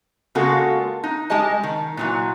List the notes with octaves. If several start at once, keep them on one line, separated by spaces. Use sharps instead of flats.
C#3 G#3 A#3 F4 F#4 A4
D#4
G3 G#3 G4 D#5 A5
D#3
A#2 E3 F#3